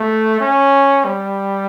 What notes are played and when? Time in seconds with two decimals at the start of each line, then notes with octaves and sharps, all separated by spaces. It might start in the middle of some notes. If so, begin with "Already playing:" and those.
Already playing: A3
0.40 C#4
1.05 G3